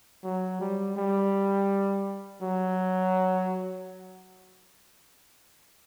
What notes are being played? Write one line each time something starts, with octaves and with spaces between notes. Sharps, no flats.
F#3
G3
G3
F#3